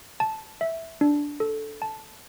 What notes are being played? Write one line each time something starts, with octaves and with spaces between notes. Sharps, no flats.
A5
E5
D4
A4
A5